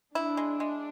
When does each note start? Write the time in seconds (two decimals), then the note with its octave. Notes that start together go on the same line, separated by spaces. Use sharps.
0.15 D4 E4
0.37 G#3
0.60 G#3